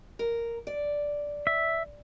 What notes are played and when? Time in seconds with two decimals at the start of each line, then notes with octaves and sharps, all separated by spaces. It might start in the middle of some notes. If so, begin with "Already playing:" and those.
0.19 A#4
0.67 D5
1.47 E5